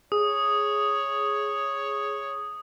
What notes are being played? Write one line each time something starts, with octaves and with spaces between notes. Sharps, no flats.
G#4 C#5 D#6